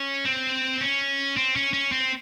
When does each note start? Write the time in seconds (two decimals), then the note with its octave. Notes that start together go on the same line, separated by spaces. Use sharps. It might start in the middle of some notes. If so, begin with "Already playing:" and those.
Already playing: C#4
0.25 C4
0.81 C#4
1.37 C4
1.56 C#4
1.73 C#4
1.92 C4